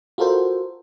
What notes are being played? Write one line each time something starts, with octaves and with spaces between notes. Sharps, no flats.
F4 F#4 A4 A#4 C5